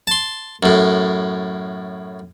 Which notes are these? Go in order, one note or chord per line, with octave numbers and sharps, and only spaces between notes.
A5 C6
F#2 A2